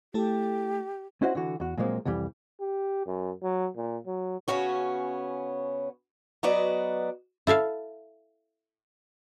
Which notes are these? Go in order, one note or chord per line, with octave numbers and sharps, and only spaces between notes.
A3 E4 G4 A4
C#4 E4 F#4 C5 D#5 F#5
D3 E3 F#4
E2 F#4
A#2 F3 F#3 G#3 A#3 C4
C2 F2 E3 G3
G4
F#2
F#3
A#2
F#3
C#3 B3 C#4 F#4 C#5
F#3 B3 F#4 B4 D5 D#5
E4 A4 E5 F5